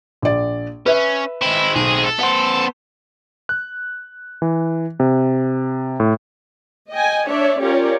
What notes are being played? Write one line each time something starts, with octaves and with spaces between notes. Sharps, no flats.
A#1 D5
C#4 B4 E5
G#3 C4 E4
B1 G#4
A4
B3 C5 F#5
F#6
E3
C3
A2
D#5 G5 G#5
D4 C#5 D5 E5
C#4 F4 G4 A#4 C#5 D5